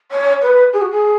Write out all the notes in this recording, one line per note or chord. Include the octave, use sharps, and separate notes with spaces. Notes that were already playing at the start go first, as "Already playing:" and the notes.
C#5
B4
G#4
F#4
G#4